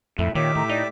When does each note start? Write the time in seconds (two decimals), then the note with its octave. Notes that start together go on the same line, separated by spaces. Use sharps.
0.19 F2 A2 E5
0.35 A#2 D#3 G4 C#5 E5 D6
0.56 A2 A#5
0.69 D#4 D5